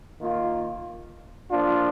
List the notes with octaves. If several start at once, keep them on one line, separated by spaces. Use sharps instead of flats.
D#3 A#3 F4
F3 A#3 D4 F4